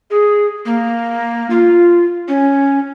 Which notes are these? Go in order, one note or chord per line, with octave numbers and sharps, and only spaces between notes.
G#4
A#3
F4
C#4